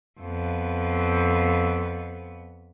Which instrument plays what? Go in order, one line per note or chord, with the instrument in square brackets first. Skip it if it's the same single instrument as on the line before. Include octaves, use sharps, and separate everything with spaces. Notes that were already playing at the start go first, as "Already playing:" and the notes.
[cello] F2 B3